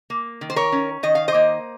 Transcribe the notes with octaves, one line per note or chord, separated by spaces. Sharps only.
A#3
D#3
C5
A#4 C#5
C#4
D#3 D#5
F5
C5 D#5
A#3